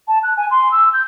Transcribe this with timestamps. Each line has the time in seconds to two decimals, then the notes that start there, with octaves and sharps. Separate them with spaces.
0.08 A5
0.23 F#6
0.37 G#5
0.51 C6
0.71 E6
0.93 G6